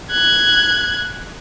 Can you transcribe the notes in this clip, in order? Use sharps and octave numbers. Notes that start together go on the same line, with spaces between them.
F#6 G#6